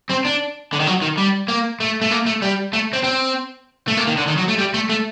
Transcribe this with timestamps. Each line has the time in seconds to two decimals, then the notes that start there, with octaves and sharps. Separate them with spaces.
0.09 C4
0.25 D4
0.73 D3
0.80 D#3
0.87 F#3
1.02 D#3
1.18 G3
1.49 A#3
1.80 A3
2.01 A3
2.11 A#3
2.26 A3
2.42 G3
2.73 A3
2.93 C4
3.04 C4
3.88 A3
3.97 A#3
4.07 D#3
4.18 D3
4.28 D#3
4.38 F#3
4.48 A3
4.59 G3
4.74 A3
4.89 A3